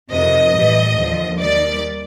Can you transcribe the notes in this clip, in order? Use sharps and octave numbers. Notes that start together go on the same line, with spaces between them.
F2 C3 D#3 D#5
A2 E3 G3
D#2 D3 F3
D#2 D#3 G3 D5